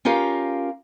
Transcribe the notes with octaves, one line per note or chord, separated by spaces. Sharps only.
C#4 F4 G4 A#4 F5